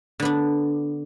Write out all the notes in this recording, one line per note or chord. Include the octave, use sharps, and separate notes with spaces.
D3 B3 D4